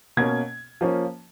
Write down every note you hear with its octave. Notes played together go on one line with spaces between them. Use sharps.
B2 A#3 C#4 G#6
F3 A#3 C#4